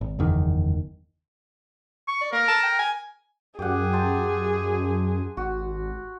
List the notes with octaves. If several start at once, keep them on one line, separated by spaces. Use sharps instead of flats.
G#1
F#1 E2 D#3
C#6
D5
A#3 A#4
A5
G5
G#5
F#2 G4 G#4 F#5
C5 A5
G#1 F#4